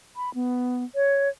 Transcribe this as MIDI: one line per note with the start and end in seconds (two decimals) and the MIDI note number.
0.16 0.33 83
0.34 0.84 59
0.95 1.29 73